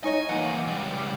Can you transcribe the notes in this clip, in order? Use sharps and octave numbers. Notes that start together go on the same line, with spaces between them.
D#4 C#5 D#5 G#5
E3 A#3 F#5 G#5
C#2 G3